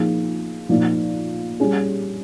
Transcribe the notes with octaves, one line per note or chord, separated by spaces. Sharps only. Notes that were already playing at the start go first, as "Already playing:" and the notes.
Already playing: F3 A#3 D#4 G#4
A#2 F3 A#3 D#4
G3 C#4 G#4